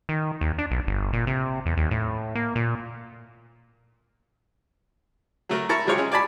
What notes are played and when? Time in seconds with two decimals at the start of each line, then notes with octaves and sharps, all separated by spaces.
0.09 D#3
0.41 D#2
0.58 D4
0.71 B1
0.87 G1
1.13 A#2
1.27 C3
1.66 E2
1.77 D#2
1.91 A2
2.35 A#3
2.55 A#2
5.49 F#3 A3 A#4
5.69 E4 A#4 A5 C#6
5.86 C3 F#3 G#3 F4 G4 C#5
5.98 G#3 C#4
6.12 D5 G#5 A5 B5